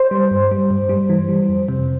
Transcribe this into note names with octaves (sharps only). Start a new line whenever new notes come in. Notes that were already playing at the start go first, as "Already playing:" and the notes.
Already playing: C5
G3
G2
G3
G2
G3
E3
G3
F2
C3